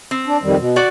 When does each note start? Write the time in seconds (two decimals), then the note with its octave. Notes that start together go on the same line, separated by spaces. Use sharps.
0.11 C4
0.27 D4
0.43 F2 D#3 G3
0.59 B2
0.76 F#4 D5